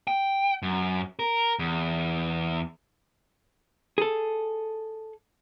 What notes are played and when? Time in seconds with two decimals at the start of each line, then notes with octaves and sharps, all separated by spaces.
0.07 G5
0.62 F#2
1.19 A#4
1.59 E2
3.98 G#4 A4